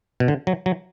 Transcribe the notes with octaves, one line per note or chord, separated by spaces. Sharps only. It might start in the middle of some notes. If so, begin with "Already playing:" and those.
B2
D3
F#3
F#3